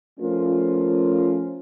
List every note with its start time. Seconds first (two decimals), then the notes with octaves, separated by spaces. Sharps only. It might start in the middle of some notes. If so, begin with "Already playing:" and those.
0.19 F3 A3 C#4 F4 A#4